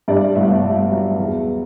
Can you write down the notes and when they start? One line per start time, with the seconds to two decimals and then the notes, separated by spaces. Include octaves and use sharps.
0.08 G2 D5
0.35 G1 E5
0.63 G1
0.91 F#3
1.18 E2